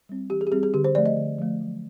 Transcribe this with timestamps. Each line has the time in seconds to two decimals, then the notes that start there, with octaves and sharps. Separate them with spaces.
0.09 G3 C4
0.30 E3 G4
0.41 G#4
0.47 G4
0.52 G3 C4 G#4
0.63 G#4
0.74 D3 G4
0.84 C5
0.95 F3 A3 D5
1.06 D#5
1.17 D3
1.38 F3 A3
1.61 F#3